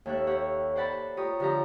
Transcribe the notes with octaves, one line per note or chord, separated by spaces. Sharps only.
D#2 A4 C#5 E5 F#6
G4 C#5 F#5
C5 D5 F#5 A5 B5
F4 G4 C#5 A#5 D#6
D3 F3 G4 F5 A#5